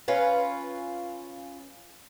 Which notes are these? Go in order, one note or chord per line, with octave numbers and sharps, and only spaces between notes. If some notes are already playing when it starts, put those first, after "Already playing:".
C#4 F4 B4